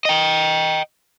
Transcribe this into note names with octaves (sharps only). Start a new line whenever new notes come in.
D#5 G5